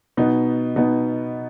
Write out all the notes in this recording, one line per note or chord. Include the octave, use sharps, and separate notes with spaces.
B2 B3 D#4
B2 B3 D#4